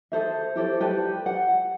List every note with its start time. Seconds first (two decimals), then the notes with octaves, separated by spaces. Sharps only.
0.12 G#4 A4 C5 E5
0.56 E4 G4 A4 C5
0.81 G4 B4 D5 A5
1.26 F#5